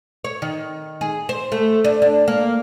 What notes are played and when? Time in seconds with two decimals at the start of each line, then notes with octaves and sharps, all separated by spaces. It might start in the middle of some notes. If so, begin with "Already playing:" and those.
0.24 C#5
0.42 D#3
1.01 G#4
1.29 C5
1.52 A3
1.84 D4
2.02 D4
2.28 A#3